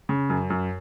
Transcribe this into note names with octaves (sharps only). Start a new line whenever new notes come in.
C#3
F#2
F#2